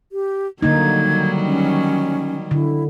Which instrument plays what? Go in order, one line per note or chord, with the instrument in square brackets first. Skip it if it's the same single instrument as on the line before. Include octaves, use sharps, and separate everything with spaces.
[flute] G4
[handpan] D3 A#3 D#4 [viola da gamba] D#3 F#3 G3 [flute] G#6
[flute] C#4
[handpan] D3 [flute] E4